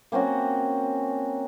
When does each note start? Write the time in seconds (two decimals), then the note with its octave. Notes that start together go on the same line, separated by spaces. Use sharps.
0.12 A#3 C4 C#4 F#4